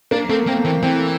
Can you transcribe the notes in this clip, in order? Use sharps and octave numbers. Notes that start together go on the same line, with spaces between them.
A#3 D4
A3 C4
A#3 C4
E3 C4
E3 C4